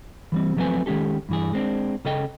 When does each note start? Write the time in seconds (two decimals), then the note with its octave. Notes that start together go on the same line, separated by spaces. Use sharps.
0.32 E3 G3 C4
0.57 F3 F#3 A3 C4 B4 G#5
0.86 D#3 G#3 C#4 G4 A4
1.29 G2 E3 G#4
1.53 G#3 C4 D4
2.05 C#3 C#4 A4 D#5 G5